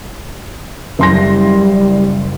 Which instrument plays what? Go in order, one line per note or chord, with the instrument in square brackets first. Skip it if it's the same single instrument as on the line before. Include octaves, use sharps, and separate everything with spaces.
[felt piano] F#1 C6 A#6 [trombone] G3